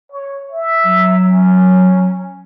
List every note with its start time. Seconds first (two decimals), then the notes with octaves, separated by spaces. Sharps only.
0.11 C#5
0.51 E5
0.85 F#3
1.29 C#4